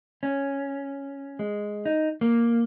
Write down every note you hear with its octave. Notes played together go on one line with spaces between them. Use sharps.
C#4
G#3
D#4
A#3